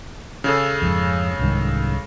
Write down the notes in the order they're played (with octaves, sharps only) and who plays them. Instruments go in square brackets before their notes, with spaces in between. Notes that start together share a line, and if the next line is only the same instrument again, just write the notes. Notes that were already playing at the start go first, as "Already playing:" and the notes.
[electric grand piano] C#3 G#4 A4
[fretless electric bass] F2 G#2
C2 G#2 D#3